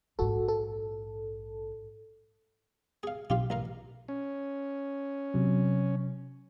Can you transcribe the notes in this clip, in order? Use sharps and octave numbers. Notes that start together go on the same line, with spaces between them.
A#1 G#2 F#4 A4
A4
G#4 F5
B1 F4 G4 F5
A1 A#4 F5
C#4
C3 F#3